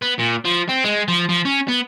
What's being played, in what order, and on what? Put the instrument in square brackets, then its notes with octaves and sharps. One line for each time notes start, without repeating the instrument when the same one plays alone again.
[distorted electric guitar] B3
A#2
F3
C4
G#3
F3
F3
C#4
B3